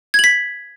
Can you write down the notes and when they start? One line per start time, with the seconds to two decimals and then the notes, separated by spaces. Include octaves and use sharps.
0.14 G#6
0.19 F#7
0.24 B6